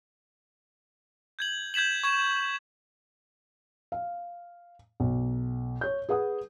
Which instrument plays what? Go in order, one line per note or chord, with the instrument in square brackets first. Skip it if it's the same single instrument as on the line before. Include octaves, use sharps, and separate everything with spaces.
[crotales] G6 G#6 F#7
G6 G#6 B6 E7 F#7
C#6 G#6 E7
[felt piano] F5
B1
C#5 G6
G#4 B4 F#5 D#6